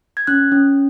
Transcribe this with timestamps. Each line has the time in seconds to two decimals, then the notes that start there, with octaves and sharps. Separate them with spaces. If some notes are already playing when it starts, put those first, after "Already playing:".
0.17 G#6
0.27 C#4 F#6
0.52 C#4